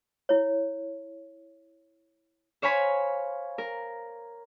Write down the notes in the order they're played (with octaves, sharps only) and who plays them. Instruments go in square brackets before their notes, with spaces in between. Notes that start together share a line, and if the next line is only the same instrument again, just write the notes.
[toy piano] E4 C#5
[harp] C5 C#5 F5 G#5 B5
A#4